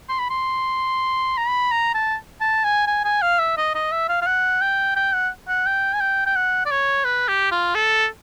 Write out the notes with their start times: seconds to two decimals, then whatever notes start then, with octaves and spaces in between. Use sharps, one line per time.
0.09 C6
0.19 B5
0.30 C6
1.38 A#5
1.48 B5
1.72 A#5
1.94 A5
2.41 A5
2.64 G#5
2.87 G#5
3.04 G#5
3.22 F5
3.39 E5
3.57 D#5
3.75 D#5
3.92 E5
4.09 F5
4.22 F5
4.27 F#5
4.61 G5
4.96 G5
5.13 F#5
5.48 F#5
5.66 G5
5.94 G#5
6.00 G5
6.26 G5
6.36 F#5
6.66 D5
6.71 C#5
7.05 B4
7.28 G4
7.51 F4
7.75 A4